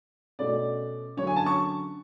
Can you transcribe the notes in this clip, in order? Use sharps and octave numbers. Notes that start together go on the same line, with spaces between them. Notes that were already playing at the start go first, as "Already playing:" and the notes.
B2 A3 C#4 D5
D3 F#3 C#4 C#5
G#5
A5
C#6